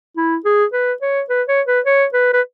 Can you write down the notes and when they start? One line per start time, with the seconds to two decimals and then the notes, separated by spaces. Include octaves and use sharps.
0.17 E4
0.45 G#4
0.73 B4
1.02 C#5
1.29 B4
1.48 C#5
1.67 B4
1.86 C#5
2.14 B4
2.34 B4